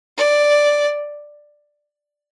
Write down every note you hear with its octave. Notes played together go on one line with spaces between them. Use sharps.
D5